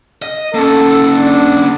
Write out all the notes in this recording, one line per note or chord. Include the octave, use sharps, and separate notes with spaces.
D#5
A#3 C#4 A4
D4